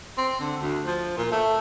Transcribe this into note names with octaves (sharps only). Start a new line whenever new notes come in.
C4
D3
D2
F3
A#2
A3